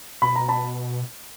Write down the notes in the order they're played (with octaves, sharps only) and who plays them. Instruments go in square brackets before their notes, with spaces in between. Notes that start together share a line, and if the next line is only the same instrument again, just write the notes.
[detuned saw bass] B2 [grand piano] B5
[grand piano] A#5
A5 B5